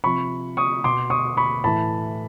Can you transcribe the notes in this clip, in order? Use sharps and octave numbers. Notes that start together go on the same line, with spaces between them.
C3 F3 B5 C#6
C#6 D#6
B2 C6 D6
C#6 D#6
B5 C#6
A2 E3 A5 B5